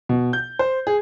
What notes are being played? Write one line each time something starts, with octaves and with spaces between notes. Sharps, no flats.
B2
G6
C5
G#4